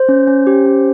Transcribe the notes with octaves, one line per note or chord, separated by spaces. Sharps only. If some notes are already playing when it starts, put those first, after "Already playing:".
Already playing: C5
C#4
C#4
G4
C#4